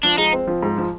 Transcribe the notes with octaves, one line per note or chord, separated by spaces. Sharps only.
F3 D4
G#3 D#4
C4
F3
G#2
F3